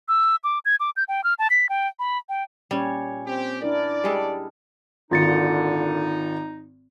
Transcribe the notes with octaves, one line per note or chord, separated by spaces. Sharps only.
E6
D6
G#6
D6
G6
G5
F6
A5
B6
G5
B5
G5
A#2 G3 C#4 C#5
C4 G4
D4 E4 A#4 D5
G3 G#3 G4 A4
G#1 A#2 D3 D#4 F4 A6 C#7